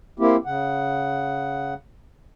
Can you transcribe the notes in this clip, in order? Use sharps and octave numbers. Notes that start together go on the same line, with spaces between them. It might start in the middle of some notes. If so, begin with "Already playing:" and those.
A#3 C4 E4 G4
C#3 F#5